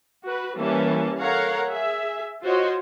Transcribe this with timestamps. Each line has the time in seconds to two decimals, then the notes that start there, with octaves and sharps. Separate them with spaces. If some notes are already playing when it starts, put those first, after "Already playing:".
0.25 F#4 B4
0.56 E3 G3 A#3 C#4 A5
1.19 A4 A#4 C#5 F5 F#5 A#5
1.66 G#4 E5
2.42 F4 F#4 C5 C#5 D#5